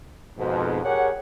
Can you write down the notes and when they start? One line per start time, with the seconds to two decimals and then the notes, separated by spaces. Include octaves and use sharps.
0.38 F2 G#2 B2
0.84 G4 G#4 A#4 C#5 F#5